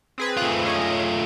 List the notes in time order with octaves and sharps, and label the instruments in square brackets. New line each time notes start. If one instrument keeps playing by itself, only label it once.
[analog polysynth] C4 G#4 B4
[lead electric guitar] A3 F4
[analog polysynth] C#4 G#4 D#5